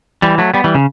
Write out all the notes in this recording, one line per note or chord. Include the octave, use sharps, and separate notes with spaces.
E3 G3
F#3 A3
G3 B3
E3 G3
C#3